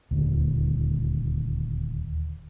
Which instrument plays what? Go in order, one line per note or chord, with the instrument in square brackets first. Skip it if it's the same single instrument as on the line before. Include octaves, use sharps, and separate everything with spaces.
[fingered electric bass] D#1 D2